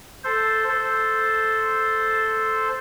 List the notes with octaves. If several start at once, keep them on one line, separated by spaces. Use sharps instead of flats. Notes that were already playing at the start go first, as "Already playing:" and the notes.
A4 C5
A4 C5